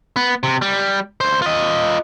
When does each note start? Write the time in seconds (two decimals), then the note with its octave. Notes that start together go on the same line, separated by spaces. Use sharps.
0.16 B3
0.43 C3
0.62 G3
1.20 D2 C5
1.42 F4 D#5